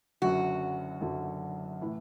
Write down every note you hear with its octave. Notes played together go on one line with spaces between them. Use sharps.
F#1 F#2 D3 F#3 F#4
F#1 F#2 D3 F#3
A2 E3